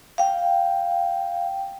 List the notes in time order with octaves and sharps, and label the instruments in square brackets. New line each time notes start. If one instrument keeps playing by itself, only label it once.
[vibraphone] F5 G5